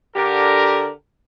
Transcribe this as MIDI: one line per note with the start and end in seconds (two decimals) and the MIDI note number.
0.16 0.89 50
0.16 0.89 67
0.16 0.89 70